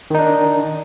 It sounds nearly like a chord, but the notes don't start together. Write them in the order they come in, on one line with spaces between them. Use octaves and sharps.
D#3 D#4 D4